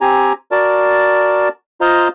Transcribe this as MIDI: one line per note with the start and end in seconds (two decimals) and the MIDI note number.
0.01 0.33 60
0.01 0.33 67
0.01 0.33 80
0.01 0.33 82
0.51 1.49 66
0.51 1.49 70
0.51 1.49 74
0.51 1.49 81
1.81 2.08 65
1.81 2.08 72
1.81 2.08 75
1.81 2.08 77
1.81 2.08 82